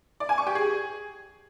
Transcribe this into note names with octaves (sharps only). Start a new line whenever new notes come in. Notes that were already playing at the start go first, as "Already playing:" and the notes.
D5
G#5
C#6
G4
G#4